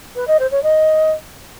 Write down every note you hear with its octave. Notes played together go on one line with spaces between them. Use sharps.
B4
D#5
C5
C#5
D#5